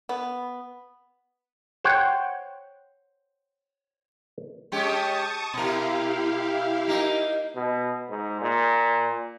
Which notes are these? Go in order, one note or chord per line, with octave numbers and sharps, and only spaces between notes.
B3
C5 C#5 F#5 G5
G#3 C#4 G4 A5 C#6 D#6
B2 E4 G4 A#4 F5
A#3 D#4 A#4
B2
G#2
A#2